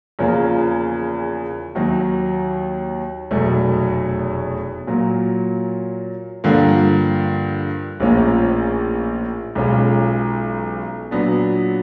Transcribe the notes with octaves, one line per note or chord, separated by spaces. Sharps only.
E2 C#3 F3 A#3
D#2 D#3 F#3
F1 E2 B2 F#3 A3
A#2 F#3 A#3
G2 D3 F3 A#3
A#1 A2 F3 A#3 C#4
B1 B2 G#3 C#4 F4
A#2 F#3 B3 D4